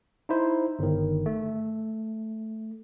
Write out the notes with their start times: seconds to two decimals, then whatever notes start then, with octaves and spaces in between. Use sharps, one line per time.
0.29 D#4 E4 C5
0.79 G1 D#3
1.26 A3